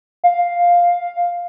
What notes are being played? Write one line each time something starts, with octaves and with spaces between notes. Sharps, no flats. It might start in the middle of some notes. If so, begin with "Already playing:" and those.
F5